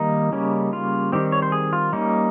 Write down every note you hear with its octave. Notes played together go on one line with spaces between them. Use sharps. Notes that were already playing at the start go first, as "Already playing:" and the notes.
Already playing: D#3 G3 A#3 D#4
C#3 G3 A#3 C#4
F4
D#3 G3 C4 G4
C#5
C5
G#4
F4
G3 A#3 C#4 D#4